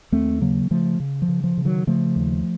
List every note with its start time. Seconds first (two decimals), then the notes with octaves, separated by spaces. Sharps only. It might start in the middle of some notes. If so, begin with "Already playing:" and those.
0.12 D#2 A3 C4
0.41 C#3 F#3 A#3
0.71 C#3 F3 A3
1.00 C#3
1.22 F3
1.28 C#3
1.44 F3
1.58 C#3
1.65 D#3 F#3
1.87 C#3 F3 A3
2.16 D#2